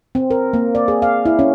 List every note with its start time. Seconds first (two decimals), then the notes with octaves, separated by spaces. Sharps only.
0.15 C4
0.31 A#4
0.53 A#3
0.75 D5
0.88 G#4
1.02 F5
1.26 E4
1.39 C#4